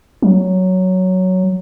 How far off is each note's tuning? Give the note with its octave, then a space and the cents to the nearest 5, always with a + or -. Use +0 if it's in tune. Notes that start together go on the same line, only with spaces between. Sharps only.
F#3 +5